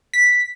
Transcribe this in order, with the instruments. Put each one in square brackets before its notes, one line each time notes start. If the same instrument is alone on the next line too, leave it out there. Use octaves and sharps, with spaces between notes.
[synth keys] B6